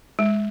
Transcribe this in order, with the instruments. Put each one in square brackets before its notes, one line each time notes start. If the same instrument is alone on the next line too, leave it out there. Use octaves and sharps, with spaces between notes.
[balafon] G#3